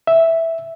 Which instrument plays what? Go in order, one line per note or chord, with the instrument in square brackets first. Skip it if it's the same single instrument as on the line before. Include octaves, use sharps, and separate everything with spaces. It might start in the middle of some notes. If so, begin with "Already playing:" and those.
[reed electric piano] E5